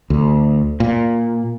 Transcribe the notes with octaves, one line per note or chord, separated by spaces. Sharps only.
D2
A#2